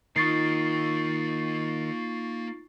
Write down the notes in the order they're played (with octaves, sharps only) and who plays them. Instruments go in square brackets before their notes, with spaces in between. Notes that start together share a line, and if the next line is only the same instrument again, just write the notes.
[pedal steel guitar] D#3 [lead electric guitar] A#3 D#5 [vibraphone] D#4 F4 [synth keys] C#6 A6 C7